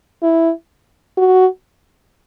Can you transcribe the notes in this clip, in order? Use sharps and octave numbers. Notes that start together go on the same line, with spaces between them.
E4
F#4